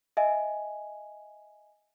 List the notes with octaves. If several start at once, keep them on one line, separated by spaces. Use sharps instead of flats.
D#5 E5 G#5